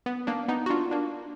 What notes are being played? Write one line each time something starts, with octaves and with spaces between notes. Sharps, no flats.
B3
A#3 D4
B3 D#4
F#4
D4 F4
A#3 D4